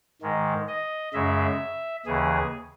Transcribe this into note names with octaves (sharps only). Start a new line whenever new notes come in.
G#2 D#3 G#3
D#5
F#2 C#3 G#3 E5
D#2 C#3 E3 G#4